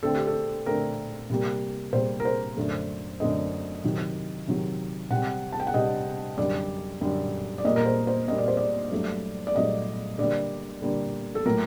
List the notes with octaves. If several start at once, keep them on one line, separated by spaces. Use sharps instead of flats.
D3 A3 C4 A4
G4
A4
D3 A3 C4 A#4
C3 G3 A#3
C3 G3 A#3 C5
A#4
C5
F#2 D3 A3
F#2 D3 A3 D#5
C3 D#3 F#3
C3 D#3 F#3
C3 G3 C4 F#5
A5
G5
F#5
C3 G3 C4 D#5
F#2 D3 G3 D5
F#2 D3 G3
D5
A#2 G3 A#3 D#5
A#4
C5
C5
A#2 G3 A#3 D#5
D5
C5
D5
G2 F#3 A3
D5
G2 F#3 A3 D#5
D3 G3 A#3 D5
D3 G3 A#3
A4
A2 F#3 A#3 A#4